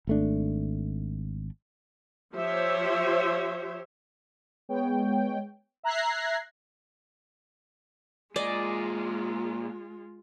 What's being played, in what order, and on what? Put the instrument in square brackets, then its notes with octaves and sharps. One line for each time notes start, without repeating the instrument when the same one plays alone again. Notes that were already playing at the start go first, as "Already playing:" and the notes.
[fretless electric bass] G#1 A3 D4
[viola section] F3 G4 C5 C#5 E5
[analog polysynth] G#3 B3 C#5 G5
E5 A#5 F#6 G#6 A#6 C7
[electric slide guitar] A#2 G#4 [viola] G#3 F4 [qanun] D5 D#5